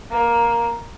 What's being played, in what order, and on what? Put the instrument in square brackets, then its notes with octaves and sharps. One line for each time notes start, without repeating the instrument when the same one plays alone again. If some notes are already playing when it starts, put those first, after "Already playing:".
[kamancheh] A#3